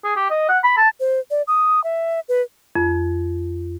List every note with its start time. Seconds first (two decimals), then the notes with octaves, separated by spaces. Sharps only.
0.04 G#4
0.16 G4
0.30 D#5
0.49 F#5
0.64 B5
0.77 A5
1.00 C5
1.31 D5
1.47 D#6
1.84 E5
2.29 B4
2.75 F2